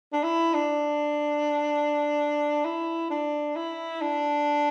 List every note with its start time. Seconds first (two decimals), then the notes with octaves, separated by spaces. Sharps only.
0.13 D4
0.23 E4
0.54 D4
2.65 E4
3.10 D4
3.56 E4
4.02 D4